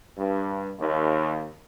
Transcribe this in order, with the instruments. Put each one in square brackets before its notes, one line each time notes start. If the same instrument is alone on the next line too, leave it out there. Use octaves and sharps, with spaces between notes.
[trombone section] G2
D#2